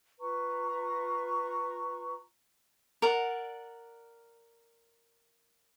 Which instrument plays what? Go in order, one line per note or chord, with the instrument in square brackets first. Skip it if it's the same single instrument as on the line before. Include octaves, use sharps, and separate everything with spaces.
[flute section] F4 B4 A#5 C#6
[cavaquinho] A#4 D5 F#5